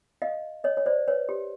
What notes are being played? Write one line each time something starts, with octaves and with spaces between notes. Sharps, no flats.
D#5 F5
C#5 D#5
C#5
C5 D5
B4 C#5
G4